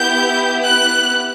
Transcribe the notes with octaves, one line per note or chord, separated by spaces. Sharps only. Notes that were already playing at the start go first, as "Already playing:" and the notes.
Already playing: B3 E4 G4 G6
F#6